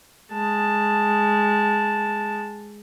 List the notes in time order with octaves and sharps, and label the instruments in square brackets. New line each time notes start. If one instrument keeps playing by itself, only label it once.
[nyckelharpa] G#3 A5